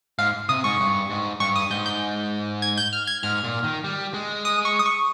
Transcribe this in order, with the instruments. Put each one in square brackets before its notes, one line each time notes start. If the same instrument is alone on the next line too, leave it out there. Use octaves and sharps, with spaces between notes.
[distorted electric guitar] G#2 [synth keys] F5
[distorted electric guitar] C3 [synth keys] D#6
[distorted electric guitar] G#2 [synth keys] C#6
[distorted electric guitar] G2
G#2
[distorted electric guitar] G2 [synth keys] C#6
[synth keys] D#6
[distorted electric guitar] G#2 [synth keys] G6
[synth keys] G6
G#6
G6
F6
G#6
[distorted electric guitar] G#2 [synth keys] F6
[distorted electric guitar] A#2
D#3
G3
G#3
[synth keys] D#6
C#6
D#6
C#6